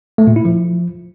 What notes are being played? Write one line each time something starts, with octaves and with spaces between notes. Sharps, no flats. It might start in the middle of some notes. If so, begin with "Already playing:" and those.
A3
A#2
E4
F3